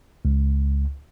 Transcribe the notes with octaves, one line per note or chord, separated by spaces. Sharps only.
C#2